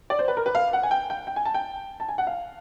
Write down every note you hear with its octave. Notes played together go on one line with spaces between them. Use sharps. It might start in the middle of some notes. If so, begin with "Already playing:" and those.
D5
C5
B4
A#4
B4
F5
F#5
G#5
G5
G5
G5
G#5
A5
G5
A5
G#5
F#5
F5